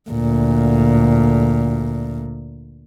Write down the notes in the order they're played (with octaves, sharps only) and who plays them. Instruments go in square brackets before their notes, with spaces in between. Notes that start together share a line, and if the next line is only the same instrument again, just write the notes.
[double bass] D2 A#2